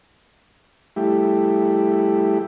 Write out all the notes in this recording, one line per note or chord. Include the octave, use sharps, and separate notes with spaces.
G3 A3 E4 G4